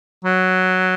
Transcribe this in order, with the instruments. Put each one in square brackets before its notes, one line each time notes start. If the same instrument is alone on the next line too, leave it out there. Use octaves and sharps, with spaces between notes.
[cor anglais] F#3